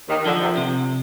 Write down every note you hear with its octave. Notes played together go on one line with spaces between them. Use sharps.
D#2 D#3
D3 F3
C3
C3